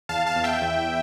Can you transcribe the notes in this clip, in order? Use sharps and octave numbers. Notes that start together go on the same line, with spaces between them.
E2 F5 A5
F5 A5
E2
E5 G5
E2